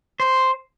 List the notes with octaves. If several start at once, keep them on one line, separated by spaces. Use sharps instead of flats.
C5